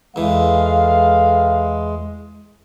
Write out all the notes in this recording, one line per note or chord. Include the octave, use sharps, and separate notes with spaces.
E2 E3 G#3 A4 B4 F5